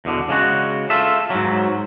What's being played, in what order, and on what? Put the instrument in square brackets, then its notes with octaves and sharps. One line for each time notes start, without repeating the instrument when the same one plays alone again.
[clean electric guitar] E2 B2 D3
C#3 G#3 F#4
F4 A4 E5
G#2 F#3